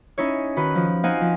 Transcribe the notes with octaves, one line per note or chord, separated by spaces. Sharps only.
C#4 D#4 E4 C#5
D#3 F#4 B4 B5
F3
C4 D#4 F5 F#5 G#5
F3